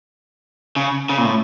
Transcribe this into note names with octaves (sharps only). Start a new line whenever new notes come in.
C#3
C#3
A#2
A2